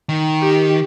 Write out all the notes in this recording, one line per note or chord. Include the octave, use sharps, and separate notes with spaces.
D#3
G4